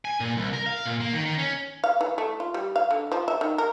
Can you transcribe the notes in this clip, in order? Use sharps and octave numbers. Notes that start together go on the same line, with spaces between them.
G#5
A#2
C2
A#4
F5
A#2
A#3
D#3
D#3
C#4
F5
E3
A3
F4
G3
F5
D3
F3
E5
D#3
A#4